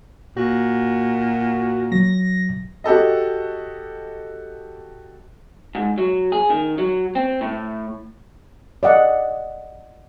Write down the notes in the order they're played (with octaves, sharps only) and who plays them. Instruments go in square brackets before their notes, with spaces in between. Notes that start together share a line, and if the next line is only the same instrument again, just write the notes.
[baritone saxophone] A#2 [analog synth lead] F#4
[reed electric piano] F#3 [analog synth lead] A#6
[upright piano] F#4 G4 A4 D#5
[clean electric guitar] G#2
F#3
G#4
D#3
F#3
C4
A2
[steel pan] D5 D#5 F#5